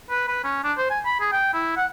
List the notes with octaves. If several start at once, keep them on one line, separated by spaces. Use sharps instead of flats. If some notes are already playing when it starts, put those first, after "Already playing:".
B4
B4
C#4
D4
C5
G#5
B5
G#4
G5
E4
F#5